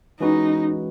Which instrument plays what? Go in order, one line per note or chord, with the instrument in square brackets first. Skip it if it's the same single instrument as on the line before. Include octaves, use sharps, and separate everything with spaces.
[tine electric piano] E3 G#3 C#4 F#4 B4 [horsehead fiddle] D#4